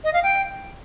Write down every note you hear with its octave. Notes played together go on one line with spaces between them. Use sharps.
D#5
F5
G5